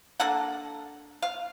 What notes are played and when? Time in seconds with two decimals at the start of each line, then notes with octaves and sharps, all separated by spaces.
0.20 A#3 D4 A4 F#5
1.22 F5